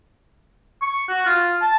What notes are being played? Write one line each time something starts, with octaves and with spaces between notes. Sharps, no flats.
C#6
F#4
F4
A5